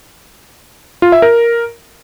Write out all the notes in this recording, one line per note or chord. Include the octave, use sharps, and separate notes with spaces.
F4
E5
A#4